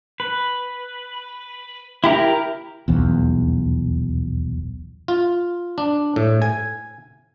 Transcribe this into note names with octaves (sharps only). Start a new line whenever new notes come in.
B4
E4 G4 A#4 A#5
D#1 B1 E2
F4
D4
A2
G#5